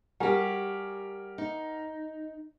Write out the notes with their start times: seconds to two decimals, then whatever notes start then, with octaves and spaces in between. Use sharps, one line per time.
0.20 G3 F#4 G4 A#4 G#5
1.38 D#4